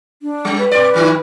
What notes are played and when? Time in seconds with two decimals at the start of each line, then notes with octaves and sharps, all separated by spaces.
0.22 D4
0.45 G3
0.58 B4
0.71 B2 D5
0.94 G2 D#3 D#4